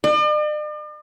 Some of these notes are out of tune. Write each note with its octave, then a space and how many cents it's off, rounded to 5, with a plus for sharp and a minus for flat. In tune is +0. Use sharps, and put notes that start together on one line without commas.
D5 +45